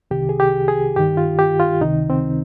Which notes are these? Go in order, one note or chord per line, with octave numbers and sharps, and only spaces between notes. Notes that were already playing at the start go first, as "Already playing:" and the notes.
C2 C3 D#3 G4
G#4
G4
G#4
G2 D#3 G4
F4
G4
F4
C#2 C3 D#3 D#4
C4